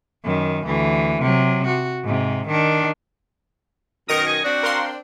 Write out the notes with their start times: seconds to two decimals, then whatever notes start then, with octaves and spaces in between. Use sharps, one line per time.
0.25 F#2 D#3
0.66 D2 E3
1.21 C3 F#3
1.66 F#4
2.04 G#2 C3
2.48 D#3 D4
4.08 F#2 B2 D#3 A#4 D#6 A#6 C#7
4.27 G#5
4.44 C4 D4 F#4
4.63 A#4 F5 C6